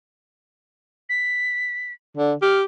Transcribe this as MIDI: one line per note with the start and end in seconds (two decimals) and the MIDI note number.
1.09 1.93 95
2.17 2.34 50
2.42 2.64 67
2.42 2.58 89